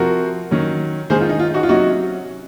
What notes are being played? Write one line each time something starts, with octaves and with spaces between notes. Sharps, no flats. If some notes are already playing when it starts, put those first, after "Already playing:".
Already playing: C3 F3 C4 F#4 A#4
D#3 F#3 C#4
D#3 G#3 C#4 G#4 C5
F4
D#4
F4
D#4 F#4
F4
C3 F#3 C#4 D#4 F#4